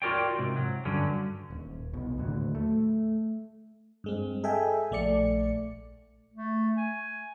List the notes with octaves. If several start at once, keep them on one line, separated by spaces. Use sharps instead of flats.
F4 F#4 A#4 C#5 D5 G5
G#2 C3
F#3
G2 D3 F#3 C#4
D#1
C2 B2
D#2 A2 D3 F#3
A3
G2 G#3 C4
G#4 A4 D#5 E5 G5 G#5
A#1 A3 D5 C#7
A3
G#5